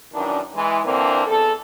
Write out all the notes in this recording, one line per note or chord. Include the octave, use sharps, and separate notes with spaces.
F#2 D#3 E3 D4
E3 G#3
D3 E3 A#3 C4 D4
E2 A4